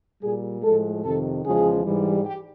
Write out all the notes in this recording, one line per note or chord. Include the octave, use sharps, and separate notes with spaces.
A#2 G3 G#4
A2 F3 G#3 A4
F2 C3 D#3 A4
E2 C#3 F3 G#3 G#4
G#2 E3 G3
G4